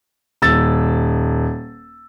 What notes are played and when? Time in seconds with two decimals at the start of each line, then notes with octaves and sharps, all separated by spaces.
0.42 D#1 E6 A6